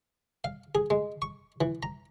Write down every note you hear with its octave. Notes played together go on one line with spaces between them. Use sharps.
F5
G#4
G#3
C#6
E3
A#5